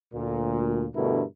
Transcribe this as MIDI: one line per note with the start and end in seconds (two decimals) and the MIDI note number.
0.14 0.85 38
0.14 0.85 46
0.95 1.23 43
0.95 1.23 47
0.95 1.23 50
0.95 1.23 57
0.95 1.23 64
0.95 1.23 70